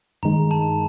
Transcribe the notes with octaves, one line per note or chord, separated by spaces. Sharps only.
G2 D#3 G#3 A#5
A5